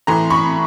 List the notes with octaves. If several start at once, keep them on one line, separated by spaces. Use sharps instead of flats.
A2 E3 A3 A#5 C6
B5 C#6